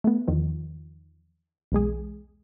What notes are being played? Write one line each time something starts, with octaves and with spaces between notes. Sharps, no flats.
A3 B3
E2 D#3 F3
B1 E2 G#3 G#4